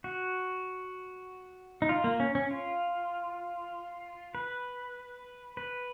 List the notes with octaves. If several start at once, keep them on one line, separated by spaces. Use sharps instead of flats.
F#4
D#4
F4
A#3
C#4
C#4
F4
B4
B4